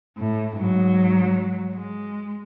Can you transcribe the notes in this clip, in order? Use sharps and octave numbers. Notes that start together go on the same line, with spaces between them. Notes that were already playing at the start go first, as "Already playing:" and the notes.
A2
G#2 F#3
G#3